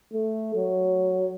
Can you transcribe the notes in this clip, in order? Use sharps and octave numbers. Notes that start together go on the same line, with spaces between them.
A3
F#3